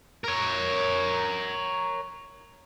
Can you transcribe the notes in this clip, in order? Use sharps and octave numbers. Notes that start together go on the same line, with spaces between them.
A#4 C#5